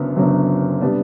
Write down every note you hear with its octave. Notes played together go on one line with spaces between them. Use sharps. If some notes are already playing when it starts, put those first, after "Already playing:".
Already playing: F#1 F#2 D3 F#3 B3
F#1 F#2 D3 F#3 B3
C3 G3 B3 D4